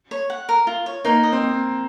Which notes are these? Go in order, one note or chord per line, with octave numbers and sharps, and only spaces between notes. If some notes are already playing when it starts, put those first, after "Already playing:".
C#5
F#5
A#4
F4
C#5
A#3 D#4
D#5
C4